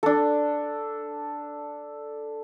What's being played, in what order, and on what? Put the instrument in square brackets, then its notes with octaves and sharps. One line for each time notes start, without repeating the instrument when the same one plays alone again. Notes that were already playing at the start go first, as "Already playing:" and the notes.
[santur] D4 A4